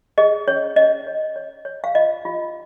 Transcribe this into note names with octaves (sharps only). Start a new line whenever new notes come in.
G#4 D#5
C#4 C#5
C#4 D#5
C#5
C#5
C#5
F5
F4 D#5
F4